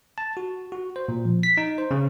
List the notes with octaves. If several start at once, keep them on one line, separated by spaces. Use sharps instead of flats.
A5
F#4
F#4
C5
A#2
F3
B6
D#4
C5
C#3